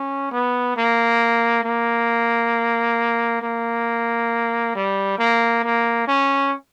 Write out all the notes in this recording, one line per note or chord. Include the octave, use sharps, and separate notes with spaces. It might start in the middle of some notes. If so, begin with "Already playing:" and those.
Already playing: C#4
B3
A#3
A#3
A#3
G3
A#3
A#3
C#4